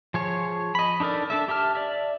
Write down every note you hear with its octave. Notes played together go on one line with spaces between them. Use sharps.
F3 G#4 C#5
D#5 B5
D4 D#4 A4 A#4 D5
D4 A4 E5
G4 E5 A5 F6
D5 E5